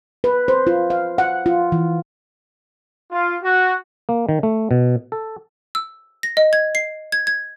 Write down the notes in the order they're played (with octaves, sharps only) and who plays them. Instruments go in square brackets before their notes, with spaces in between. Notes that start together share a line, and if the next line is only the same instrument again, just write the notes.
[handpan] B4
C5
F4
F5
F#5
F4
E3
[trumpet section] F4
F#4
[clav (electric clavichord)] A#3
D#3
A3
B2
A4
[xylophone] E6
A#6
D#5
G#6
C7
G#6
G#6